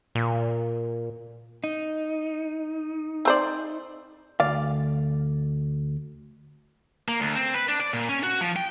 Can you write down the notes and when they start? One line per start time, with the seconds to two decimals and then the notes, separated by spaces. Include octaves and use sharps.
0.15 A#2
1.64 D#4
3.25 C4 C5 D5
4.40 D2 D5 F5
7.08 A#3
7.20 D2
7.36 C4
7.54 B4
7.68 D4
7.80 D5
7.93 A#2
8.09 C#4
8.23 F#4
8.41 F3
8.56 G5